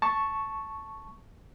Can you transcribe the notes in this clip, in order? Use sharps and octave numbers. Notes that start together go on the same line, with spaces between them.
A5 C#6